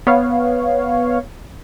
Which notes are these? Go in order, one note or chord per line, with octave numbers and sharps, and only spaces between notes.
B3 C#5 F5